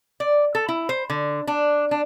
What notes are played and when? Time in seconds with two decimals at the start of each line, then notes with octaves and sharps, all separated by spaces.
0.20 D5
0.55 A4
0.68 E4
0.89 C5
1.10 D3
1.47 D4
1.91 D4